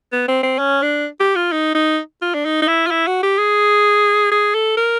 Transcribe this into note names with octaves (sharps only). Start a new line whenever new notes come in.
B3
C4
C4
C#4
D4
G4
F4
D#4
D#4
F4
D4
D#4
D#4
E4
F4
E4
F#4
G4
G#4
G#4
A4
A#4